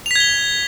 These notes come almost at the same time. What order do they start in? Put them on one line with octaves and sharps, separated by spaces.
F7 B6 G#6 G7